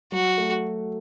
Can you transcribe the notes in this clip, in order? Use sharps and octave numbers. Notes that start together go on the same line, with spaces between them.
F#3 F#4
A3